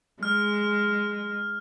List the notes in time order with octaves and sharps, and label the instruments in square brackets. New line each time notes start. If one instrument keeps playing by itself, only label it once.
[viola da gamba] G#3 [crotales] F6